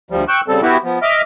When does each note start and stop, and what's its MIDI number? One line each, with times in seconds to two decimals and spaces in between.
0.11 0.24 38
0.11 0.24 53
0.11 0.24 55
0.28 0.41 79
0.28 0.41 85
0.28 0.41 88
0.28 0.41 90
0.48 0.61 49
0.48 0.61 55
0.48 0.61 60
0.48 0.61 69
0.62 0.77 59
0.62 0.77 64
0.62 0.77 66
0.62 0.77 67
0.84 0.99 53
0.84 0.99 59
1.02 1.22 75
1.02 1.22 76
1.02 1.22 86
1.02 1.22 89